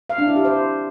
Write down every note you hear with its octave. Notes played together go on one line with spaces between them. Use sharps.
F5
D4
E4
G4
C5